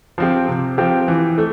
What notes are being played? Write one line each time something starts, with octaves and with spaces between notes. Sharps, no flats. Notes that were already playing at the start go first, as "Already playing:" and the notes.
F3 C4 G4
C3
F3 C4 G4
E3
A3